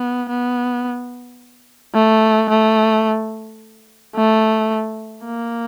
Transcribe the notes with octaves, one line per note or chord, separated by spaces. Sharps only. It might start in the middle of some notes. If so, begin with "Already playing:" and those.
Already playing: B3
B3
A3
A3
A3
A#3